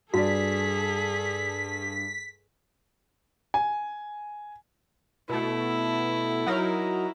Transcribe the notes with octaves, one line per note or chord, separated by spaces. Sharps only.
G2 F#4 G#4 A4 D5 B6
G#5
B2 A3 E4
F#3 D#4 A#4